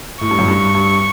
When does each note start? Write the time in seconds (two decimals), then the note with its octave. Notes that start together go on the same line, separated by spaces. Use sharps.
0.21 A2 C#6
0.31 G2
0.38 F#2 A2
0.48 G2
0.75 G2